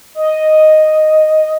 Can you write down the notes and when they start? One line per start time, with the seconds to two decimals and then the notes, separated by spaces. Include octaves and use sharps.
0.15 D#5